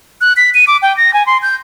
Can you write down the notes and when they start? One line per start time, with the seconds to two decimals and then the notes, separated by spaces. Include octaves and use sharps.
0.21 F#6
0.37 B6
0.54 D#7
0.67 D6
0.82 G5
0.97 A#6
1.14 G#5
1.26 C6
1.42 G6